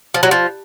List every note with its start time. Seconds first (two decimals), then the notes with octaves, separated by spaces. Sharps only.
0.14 F3
0.23 F#3
0.31 F3